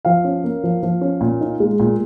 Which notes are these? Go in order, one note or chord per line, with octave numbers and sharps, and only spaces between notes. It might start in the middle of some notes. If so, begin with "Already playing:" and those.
F3 F5
C#4
A#3
F3
F3
C#4
A#2
D#4
G#3
A#2